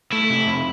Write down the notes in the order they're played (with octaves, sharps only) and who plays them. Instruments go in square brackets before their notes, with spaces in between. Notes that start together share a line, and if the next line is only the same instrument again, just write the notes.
[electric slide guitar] A3 [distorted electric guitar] E4
[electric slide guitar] C3
F2